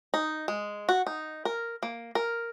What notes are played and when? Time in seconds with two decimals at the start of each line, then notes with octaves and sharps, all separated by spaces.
0.14 D#4
0.48 G#3
0.89 F#4
1.07 D#4
1.45 A#4
1.83 A#3
2.15 A#4